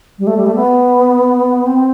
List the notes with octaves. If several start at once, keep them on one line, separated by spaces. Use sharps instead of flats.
G3
A3
G3
A3
B3
C4